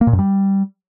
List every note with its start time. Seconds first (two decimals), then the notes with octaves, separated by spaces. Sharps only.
0.01 A#3
0.07 A#2
0.13 F#2
0.19 G3